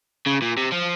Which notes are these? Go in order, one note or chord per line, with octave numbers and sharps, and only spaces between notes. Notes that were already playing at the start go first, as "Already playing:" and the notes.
C#3
A#2
C3
F3